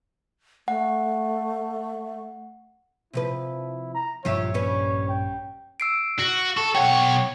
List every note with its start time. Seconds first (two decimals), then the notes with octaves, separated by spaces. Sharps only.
0.68 A3 F#5
3.13 C3 F3 E4 B4
3.95 A#5
4.25 A#1 G2 F3 F4 G4 C#5 E5
4.54 G3 C#4 B4
5.09 G5
5.80 E6 C7 D7
6.19 F#4
6.57 A4 C#6
6.75 B1 C#5 F#5 G5